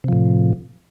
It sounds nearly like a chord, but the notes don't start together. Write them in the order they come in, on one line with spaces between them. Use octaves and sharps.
C3 F3 A2